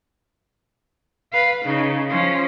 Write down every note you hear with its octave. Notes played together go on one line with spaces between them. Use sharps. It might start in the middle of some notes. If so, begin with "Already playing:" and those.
B4 F5
C#3 D#4
F3 C#4